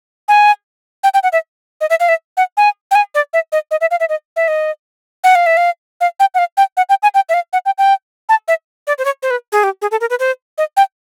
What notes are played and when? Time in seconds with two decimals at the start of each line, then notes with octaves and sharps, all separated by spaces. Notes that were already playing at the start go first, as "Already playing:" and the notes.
0.28 G#5
1.04 G5
1.14 G5
1.23 F#5
1.33 E5
1.81 D#5
1.90 E5
2.00 F5
2.09 E5
2.37 F#5
2.57 G#5
2.91 G5
2.95 G#5
3.15 D5
3.33 E5
3.52 D#5
3.71 D#5
3.81 E5
3.91 F5
4.00 E5
4.09 D#5
4.36 E5
4.48 D#5
5.24 F#5
5.35 F5
5.46 E5
5.57 F5
6.01 F5
6.20 G5
6.35 F#5
6.38 F5
6.57 G5
6.77 F#5
6.89 G5
7.03 G#5
7.15 G5
7.29 E5
7.34 F5
7.53 F#5
7.66 G5
7.78 G5
8.29 A5
8.48 E5
8.87 D5
8.98 C5
9.05 C#5
9.23 C5
9.31 B4
9.52 G#4
9.63 G4
9.82 G#4
9.91 A4
10.01 A#4
10.10 B4
10.20 C5
10.58 D#5
10.77 G5